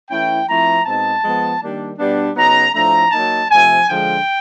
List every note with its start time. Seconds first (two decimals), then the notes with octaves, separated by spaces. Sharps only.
0.09 E3 A3 C#4 E4 G5
0.47 F3 A3 C4 E4 A#5
0.85 B2 G#3 C4 D#4 A5
1.23 F3 G#3 B3
1.61 D#3 G3 A#3 D4
1.99 B2 G3 B3 D4
2.36 C#3 F#3 B3 D#4 A#5
2.74 A2 F3 A3 D4 A#5
3.11 F#3 A#3 D#4 A5
3.50 C3 F3 A3 G#5
3.87 D3 F3 G#3 G5